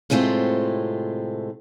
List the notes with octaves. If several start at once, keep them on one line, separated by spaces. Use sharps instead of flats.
A2 C3 G#3 A3 C4 F4